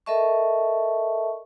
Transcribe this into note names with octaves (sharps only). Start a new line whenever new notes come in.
A4 A#4 D#5 E5 A5 C#6